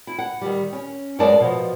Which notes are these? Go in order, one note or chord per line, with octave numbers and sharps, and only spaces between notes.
E4
F#5
D#3 G3
C#4
F#2 G#3 B3 A#4 D5 A5
B2 F3